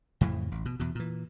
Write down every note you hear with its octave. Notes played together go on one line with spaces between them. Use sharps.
F2 A2 C#3 E3
A1
B2
E2 B2
A#2 E3